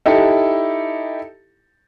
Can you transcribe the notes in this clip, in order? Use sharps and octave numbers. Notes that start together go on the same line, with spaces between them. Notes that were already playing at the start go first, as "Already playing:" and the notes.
D#4 E4 G4 A4